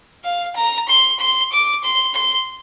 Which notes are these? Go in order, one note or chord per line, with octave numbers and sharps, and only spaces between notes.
F5
A#5
C6
C6
D6
C6
C6